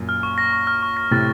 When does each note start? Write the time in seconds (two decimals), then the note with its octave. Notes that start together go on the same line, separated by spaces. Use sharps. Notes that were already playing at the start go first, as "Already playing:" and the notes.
Already playing: F#2 A#2
0.09 F6
0.23 C#6
0.38 A#6
0.53 C#6
0.67 F6
0.83 C#6
0.97 A#6
1.11 A2 C3 A6